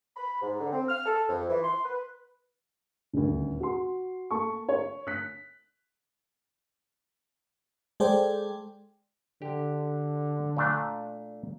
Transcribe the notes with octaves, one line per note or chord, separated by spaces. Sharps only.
B5
G#2
D3
C4
F6
A4
F2
E3
C6
B4
D#1 D2
F#4 C6
A#3 A4 A5 C#6
C#5
F#6 B6
G#3 G#4 A4 C5 D5 G5
D3 G4
A#2 A3 D4